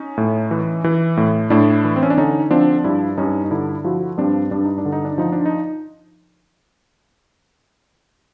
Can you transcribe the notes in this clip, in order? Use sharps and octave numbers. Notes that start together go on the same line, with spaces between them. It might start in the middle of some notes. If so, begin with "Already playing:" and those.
Already playing: C#4 D#4
A2
E3
E3
A2
A2 D4 E4
E3
C4
C#4
D4
D3 C#4 D#4
F3 C4 D4
G2 D4 E4
G2 C#4 D#4
D#4
D3 D4 E4
F3 E4 F#4
G2 C4 D4
G2 D4
D#4
D4
D3
D#4
D4
F3 D#4
D4
D#4